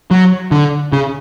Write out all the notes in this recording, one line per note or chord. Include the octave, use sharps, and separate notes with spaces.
F#3
D3
C#3